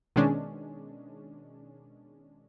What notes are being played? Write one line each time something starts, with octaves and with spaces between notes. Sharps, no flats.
B2 D#3 G#3 C#4 D4